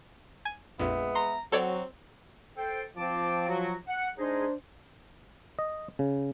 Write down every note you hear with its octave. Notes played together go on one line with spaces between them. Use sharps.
G#5
A#1 F2 G#3 B3 E5
A#5 C6
F#3 C4 A4 C#5 D5
A4 C5 G5
F3 C4 A5 D6
F#3 F#4
F#5
G#3 D4 D#4 G#4 C5
D#5
C#3